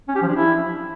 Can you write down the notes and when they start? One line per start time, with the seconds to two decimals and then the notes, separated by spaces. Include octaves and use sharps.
0.08 C#4
0.15 G4
0.22 F3
0.29 D4
0.36 E4